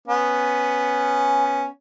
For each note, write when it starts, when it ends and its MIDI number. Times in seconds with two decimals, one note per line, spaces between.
0.08 1.66 59
0.08 1.66 61